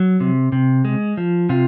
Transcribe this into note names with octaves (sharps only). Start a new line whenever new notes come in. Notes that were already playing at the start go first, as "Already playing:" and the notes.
Already playing: F#3
C3
C3
G#3
F3
C3 F4